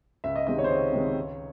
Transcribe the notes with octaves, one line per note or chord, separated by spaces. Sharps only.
C#2 E5
D#5
C3 D#3 G#3 C4 D#5
C#5
C5
C#2 C#5
C3 D#3 G#3 C4
C#2